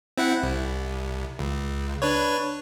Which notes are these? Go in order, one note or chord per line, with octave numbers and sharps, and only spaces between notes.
C4 E4 F#5
C2
C#2
D4 B4 C#5